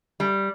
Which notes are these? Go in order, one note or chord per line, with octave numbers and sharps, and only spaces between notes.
G3